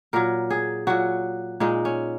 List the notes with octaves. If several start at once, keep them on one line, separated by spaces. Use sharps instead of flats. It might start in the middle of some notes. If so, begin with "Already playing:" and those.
A#2 F#3 A#4
G#4
A#2 F#3 F#4
A#2 G#3 D#4
C#4